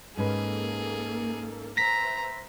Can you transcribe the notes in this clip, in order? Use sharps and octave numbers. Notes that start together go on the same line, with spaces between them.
G#2 A#3 C#4 G#4 A4 B4
B4 C5 E5 A#5 A#6 B6